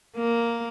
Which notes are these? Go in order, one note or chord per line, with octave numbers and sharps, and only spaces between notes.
A#3